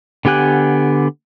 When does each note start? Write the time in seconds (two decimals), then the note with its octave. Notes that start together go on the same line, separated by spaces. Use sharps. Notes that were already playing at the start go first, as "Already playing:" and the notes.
0.25 D3 B3 G4 G#5 F#6